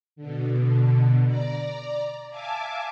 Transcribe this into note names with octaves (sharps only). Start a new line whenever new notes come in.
B2 D3
D5 A#5
E5 F5 G#5 A5 D6